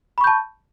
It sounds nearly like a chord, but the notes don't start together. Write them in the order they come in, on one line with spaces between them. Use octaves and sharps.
B5 C#6 G6 A5